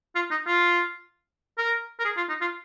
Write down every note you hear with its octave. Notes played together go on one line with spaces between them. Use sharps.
F4
D#4
F4
A#4
A#4
G#4
F4
D#4
F4